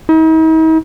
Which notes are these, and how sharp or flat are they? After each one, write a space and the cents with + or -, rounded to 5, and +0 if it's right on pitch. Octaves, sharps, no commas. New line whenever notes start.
D#4 +45